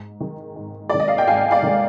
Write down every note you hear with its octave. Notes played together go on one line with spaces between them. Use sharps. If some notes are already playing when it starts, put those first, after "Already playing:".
Already playing: G#2
D#3 G#3
G#2
D#3 G#3 D5
D#5
F5
G5
G#2 F5 G#5
D5 F5
D#3 G#3